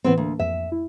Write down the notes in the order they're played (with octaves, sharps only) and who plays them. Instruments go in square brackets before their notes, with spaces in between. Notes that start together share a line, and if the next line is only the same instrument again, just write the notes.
[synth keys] A2 E3 [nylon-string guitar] B3 C4
[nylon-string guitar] D2 [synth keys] A#3
[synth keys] F2 [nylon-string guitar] E5
[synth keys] E4